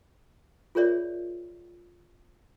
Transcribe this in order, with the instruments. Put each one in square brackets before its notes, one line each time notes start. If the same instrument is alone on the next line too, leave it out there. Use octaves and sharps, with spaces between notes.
[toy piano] F4 G#4 A#4 C#5 D5 E5